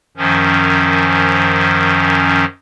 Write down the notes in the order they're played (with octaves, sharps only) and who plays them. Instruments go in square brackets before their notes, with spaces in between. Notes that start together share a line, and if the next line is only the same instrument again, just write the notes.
[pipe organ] F#2 D#3 F3 C#4